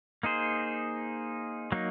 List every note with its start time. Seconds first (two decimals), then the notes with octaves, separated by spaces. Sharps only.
0.23 A#3 D#4 G#4 C5
1.72 F#3 A#3 D#4